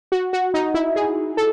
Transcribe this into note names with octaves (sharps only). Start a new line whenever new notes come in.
F#4
F#4
D#4
E4
G#4
A4